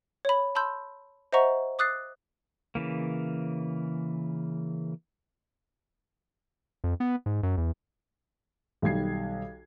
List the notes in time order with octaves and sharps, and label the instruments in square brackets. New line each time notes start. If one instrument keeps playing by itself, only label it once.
[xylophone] C#5 B5
A5 B5 C6 E6 G6
C5 D#5 E5 F#5 A#5 C#6
D6 D#6 F#6 A6 C7
[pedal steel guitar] C#3 E3 A#3
[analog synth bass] F2
B3
G#2
F#2
E2
[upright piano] B1 D#3 G3 G#6 C7